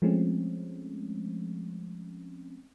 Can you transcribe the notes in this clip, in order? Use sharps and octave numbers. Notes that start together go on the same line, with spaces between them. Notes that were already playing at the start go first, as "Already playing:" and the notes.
F3 G#3 A3 C4 C#4